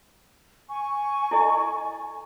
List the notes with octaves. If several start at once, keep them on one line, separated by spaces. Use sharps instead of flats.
G#5 C#6
E4 A4 D#5